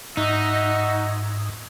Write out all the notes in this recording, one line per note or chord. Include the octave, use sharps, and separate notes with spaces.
G#2 D#4 F#4 E5